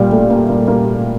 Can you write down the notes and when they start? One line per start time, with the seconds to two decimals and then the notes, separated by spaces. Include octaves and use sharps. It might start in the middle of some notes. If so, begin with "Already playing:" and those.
Already playing: A#2 G3
0.12 A3
0.30 A#3
0.49 A#3
0.68 A#3